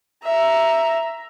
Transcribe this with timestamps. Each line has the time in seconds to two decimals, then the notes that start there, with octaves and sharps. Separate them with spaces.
0.24 E5 A#5